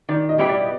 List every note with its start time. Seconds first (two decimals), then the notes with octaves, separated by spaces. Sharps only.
0.09 D#3 D5
0.29 D#5
0.38 G3 B3 E4 G4
0.49 D5